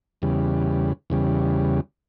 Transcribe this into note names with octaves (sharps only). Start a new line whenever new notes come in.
E2 C#3 G3
E2 C#3 G3